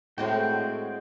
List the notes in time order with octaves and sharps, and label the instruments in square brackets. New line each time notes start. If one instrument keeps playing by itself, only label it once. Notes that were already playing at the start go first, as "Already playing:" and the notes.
[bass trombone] A2 [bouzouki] G#3 C4 F#4 [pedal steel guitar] G5